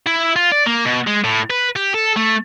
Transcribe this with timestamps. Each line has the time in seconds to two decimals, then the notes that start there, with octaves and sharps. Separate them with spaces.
0.07 E4
0.36 F4
0.52 D5
0.66 A#3
0.85 B2
1.07 G#3
1.24 A2
1.50 B4
1.76 G4
1.94 A4
2.16 A3